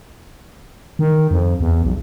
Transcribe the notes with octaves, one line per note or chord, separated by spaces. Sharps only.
D#3
F2
E2
B1